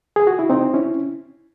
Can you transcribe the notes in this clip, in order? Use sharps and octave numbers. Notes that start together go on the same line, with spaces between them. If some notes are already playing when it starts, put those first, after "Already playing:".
G#4
F#4
E4
C4 D#4
C#4 E4